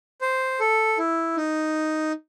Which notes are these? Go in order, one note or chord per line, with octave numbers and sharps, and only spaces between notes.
C5
A4
E4
D#4